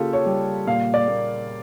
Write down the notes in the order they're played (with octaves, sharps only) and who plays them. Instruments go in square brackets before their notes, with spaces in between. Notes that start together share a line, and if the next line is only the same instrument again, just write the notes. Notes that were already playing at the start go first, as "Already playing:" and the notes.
Already playing: [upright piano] C#3 A#3 F4 G4 A4
C#5
G3
A#2 F5
D5
A#3